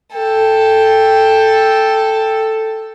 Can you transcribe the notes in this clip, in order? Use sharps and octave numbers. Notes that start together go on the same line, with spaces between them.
A4 G5